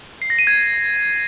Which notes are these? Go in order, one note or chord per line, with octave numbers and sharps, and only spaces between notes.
C7
A#6
D#7
G#6
D#7